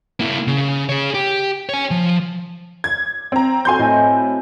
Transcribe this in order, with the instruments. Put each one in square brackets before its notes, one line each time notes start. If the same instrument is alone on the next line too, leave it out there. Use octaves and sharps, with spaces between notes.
[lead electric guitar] A#3 E4
C#3
G#4 C#5
G4
C#5 G#5
F3
[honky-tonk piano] G#6
C4 A#5
[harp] C4 F#4 A4 [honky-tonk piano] G#5 C6 G6
[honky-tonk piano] A2 [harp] D#5 G#5